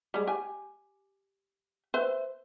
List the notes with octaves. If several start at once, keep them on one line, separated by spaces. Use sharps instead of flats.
G3 G#3
G4 G#5
B4 C5 E5